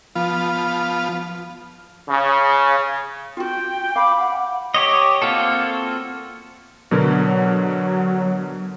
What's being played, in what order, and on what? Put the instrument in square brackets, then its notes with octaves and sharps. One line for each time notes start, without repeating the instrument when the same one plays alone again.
[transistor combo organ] F3 B3 F4
[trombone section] C#3
[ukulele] F4 F#4 [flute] G5
[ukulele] F5 [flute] B5 [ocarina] D6
[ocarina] F#5
[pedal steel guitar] G4 C#5 D#5
A#3 C4 F4 F#4 A4
[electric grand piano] B2 D3 A#4 [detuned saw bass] F#3